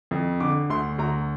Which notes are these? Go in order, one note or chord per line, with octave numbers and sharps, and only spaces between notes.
F2
D3 D6
D2 C6
D2 A#5